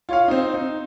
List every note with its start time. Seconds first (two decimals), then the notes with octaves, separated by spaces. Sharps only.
0.09 F4 C#5 F5
0.28 C4 D#4
0.54 D#4